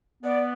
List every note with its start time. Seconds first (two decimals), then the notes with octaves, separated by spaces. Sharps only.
0.23 B3 D5